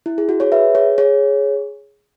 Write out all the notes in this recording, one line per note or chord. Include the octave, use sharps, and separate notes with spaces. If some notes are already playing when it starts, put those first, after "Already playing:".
E4
G#4
F#4
G#4 C#5
B4 E5
G#4 C#5
G#4 C#5